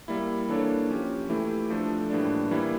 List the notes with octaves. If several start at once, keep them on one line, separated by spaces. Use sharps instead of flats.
G3 A#3 E4
E3 A#3 D4 A4 C#5
F3 C#4 G4
E3 A3 E4 G4
F3 A3 D4 A4
A2 E3 G3 A#3 D4
E3 G3 A#3 E4